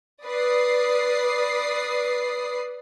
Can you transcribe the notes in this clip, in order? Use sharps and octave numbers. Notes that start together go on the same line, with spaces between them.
B4 D5 D#6 C7